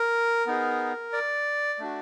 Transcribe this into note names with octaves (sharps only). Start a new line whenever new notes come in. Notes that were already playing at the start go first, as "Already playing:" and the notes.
Already playing: A#4
B3 D#4 G#4
D5
A3 D4 F#4